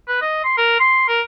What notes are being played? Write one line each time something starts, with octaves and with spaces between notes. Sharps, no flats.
B4
D#5
C6
A#4
C6
A#4